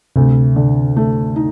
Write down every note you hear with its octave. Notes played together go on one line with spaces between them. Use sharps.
D2 C3
D3
A3
D#4